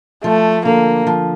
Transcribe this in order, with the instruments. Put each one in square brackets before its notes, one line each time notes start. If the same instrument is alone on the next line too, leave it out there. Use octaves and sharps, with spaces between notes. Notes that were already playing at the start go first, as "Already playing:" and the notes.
[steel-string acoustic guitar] F3 [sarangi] A3
[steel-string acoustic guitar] D3 [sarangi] A#3
[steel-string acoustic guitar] F3